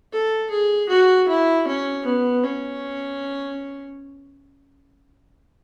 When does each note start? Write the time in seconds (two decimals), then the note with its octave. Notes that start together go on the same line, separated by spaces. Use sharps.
0.12 A4
0.50 G#4
0.89 F#4
1.28 E4
1.67 C#4
2.06 B3
2.43 C#4